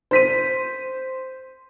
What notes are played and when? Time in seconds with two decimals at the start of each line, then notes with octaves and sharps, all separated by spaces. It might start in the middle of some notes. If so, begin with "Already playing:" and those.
0.11 C5 B6 D#7